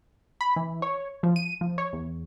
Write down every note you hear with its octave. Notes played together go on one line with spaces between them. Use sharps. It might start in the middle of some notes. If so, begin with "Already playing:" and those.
B5
E3
C#5
F3
D#7
F3
C#5
E2